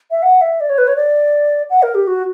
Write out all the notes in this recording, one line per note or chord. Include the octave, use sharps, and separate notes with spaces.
E5
F#5
E5
D5
C#5
B4
C#5
D5
F#5
A#4
G4
F#4